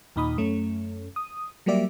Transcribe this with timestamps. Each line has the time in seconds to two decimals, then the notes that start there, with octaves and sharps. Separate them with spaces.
0.16 D#2 A#2 D#4 B5 D#6
0.37 F#2 A3 C#4
1.16 D#6
1.66 F#3 G3 A#3 G4 D5 E5